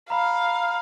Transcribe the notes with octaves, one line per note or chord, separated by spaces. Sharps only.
F5 A#5 B5